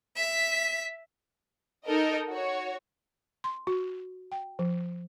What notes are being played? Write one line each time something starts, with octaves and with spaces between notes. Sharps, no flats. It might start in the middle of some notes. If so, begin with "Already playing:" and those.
E5 B6
D#4 A4 A#4 D#5
F#4 C#5
C6
F#4
G5
F3